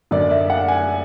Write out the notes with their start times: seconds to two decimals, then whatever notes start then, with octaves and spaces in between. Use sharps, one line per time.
0.11 F#2 D3 D5
0.31 E5
0.50 F#5
0.68 G#5